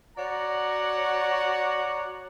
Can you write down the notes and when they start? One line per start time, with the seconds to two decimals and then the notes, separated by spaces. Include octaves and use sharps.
0.18 F#4 C#5 D5 F#5 A#5